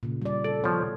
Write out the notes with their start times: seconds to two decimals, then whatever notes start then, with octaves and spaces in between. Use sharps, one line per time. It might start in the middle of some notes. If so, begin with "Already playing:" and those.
0.03 A#2 C#3
0.22 G3 D5
0.44 A4 D5
0.64 B2 F3 C#5